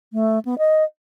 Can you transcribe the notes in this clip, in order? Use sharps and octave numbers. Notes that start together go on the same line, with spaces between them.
A3
B3
D#5